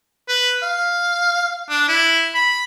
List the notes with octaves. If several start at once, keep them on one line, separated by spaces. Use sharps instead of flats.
B4
F5
D4
E4
B5